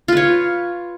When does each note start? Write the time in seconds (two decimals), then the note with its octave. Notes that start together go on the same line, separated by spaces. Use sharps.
0.08 F4
0.13 B4
0.17 C#5